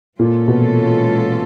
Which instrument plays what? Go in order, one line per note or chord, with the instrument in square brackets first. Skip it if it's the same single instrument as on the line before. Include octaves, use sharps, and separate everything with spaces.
[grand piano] A#2 [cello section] E3 G#3 C#4 F4 A4
[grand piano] B2